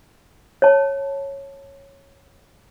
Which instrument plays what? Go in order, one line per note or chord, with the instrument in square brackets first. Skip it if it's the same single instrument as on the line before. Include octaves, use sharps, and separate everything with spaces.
[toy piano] C#5 A5